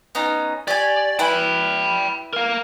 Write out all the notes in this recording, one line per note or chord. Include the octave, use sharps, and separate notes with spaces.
B3 C#4 D#4
G4 C#5 D5 G#5
E4 B4 G5 B5
A#4 F5